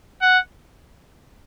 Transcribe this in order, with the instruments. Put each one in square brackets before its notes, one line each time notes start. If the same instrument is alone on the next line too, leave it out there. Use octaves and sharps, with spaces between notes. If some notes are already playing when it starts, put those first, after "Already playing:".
[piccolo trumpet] F#5